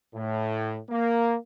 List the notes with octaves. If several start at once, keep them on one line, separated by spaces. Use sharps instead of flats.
A2
A#3